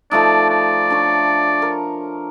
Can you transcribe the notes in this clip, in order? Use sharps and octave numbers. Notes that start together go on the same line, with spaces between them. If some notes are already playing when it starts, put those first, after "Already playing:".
F3 A3 D#4 D5
D5
D4 C#5
A#4